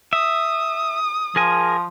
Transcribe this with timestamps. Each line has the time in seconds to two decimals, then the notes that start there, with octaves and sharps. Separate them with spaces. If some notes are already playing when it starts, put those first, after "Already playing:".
0.13 E5 D#6
1.36 F3 G#4 A#4 G#5